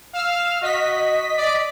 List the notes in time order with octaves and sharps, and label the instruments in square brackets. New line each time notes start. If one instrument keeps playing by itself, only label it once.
[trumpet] F5 [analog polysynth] E6 F6
[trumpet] F#4 [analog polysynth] D#5 B6
[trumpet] D5